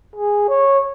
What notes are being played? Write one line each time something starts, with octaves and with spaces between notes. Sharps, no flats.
G#4
C#5